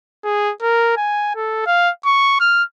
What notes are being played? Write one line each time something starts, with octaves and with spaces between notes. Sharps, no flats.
G#4
A#4
G#5
A4
F5
C#6
F6